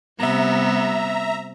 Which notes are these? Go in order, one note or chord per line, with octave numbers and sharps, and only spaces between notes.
C3 G3 B3 E5 A#5